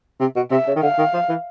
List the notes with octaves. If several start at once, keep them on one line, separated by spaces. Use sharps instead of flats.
C3
B2
C3 E5
C#3
D#3
D3 F5
D#3
F3
E3